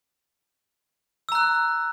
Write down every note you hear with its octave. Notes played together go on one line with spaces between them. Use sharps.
A#5 E6 F#6